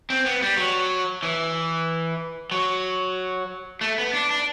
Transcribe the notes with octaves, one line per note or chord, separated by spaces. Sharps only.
C4
B3
G3
F#3
E3
F#3
A3
B3
D4
D4